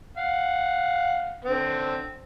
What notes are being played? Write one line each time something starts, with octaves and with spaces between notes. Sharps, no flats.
F5 F#5
D3 C4